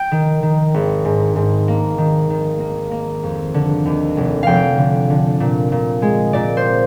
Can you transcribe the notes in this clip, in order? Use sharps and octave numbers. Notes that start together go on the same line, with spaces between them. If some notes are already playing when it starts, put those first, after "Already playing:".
Already playing: G5
D#3
D#3
G#1
G#2
G#2
A#3
D#3
D#3
A#3
A#3
F2
D3
D#2
F1
F1 F5 G5
D3
D3
A#2
A#2
G#3
A#2 D5
C5
C4